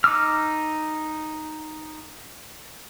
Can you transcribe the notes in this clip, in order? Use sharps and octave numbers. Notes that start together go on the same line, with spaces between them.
D#4 D6 E6 F6